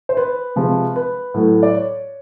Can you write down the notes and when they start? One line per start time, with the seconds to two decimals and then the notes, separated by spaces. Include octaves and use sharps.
0.09 C5
0.17 B4
0.56 C3 F3 G#3
0.96 B4
1.34 A2 F#3 A3
1.63 D5
1.74 C#5